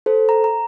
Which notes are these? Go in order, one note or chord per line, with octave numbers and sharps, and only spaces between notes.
A4 C5
A#5
A#5